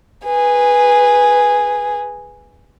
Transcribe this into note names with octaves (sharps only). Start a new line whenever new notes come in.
G#4 B4